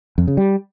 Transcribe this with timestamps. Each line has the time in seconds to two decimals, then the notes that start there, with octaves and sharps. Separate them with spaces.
0.18 F2
0.28 C#3
0.37 G3